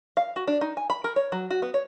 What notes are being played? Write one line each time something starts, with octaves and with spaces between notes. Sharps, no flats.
F5
F#4
D4
D#4
G#5
B5
A#4
C#5
F#3
F#4
B3
C#5